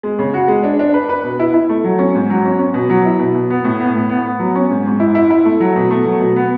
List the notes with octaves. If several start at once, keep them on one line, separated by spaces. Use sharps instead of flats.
G#3
C#3
F#4
G#3
D4
D4
B4
B4
B2
E4
E4
A3
F#3
C#4
G#2
F#3
C#4
C#4
B2
F#3
E4
B2
B2
B3
A2
B3
A2
B3
B3
F#3
C#4
G#2
G#2
E4
E4
E4
A3
F#3
B2
A3
F#3
B2
B3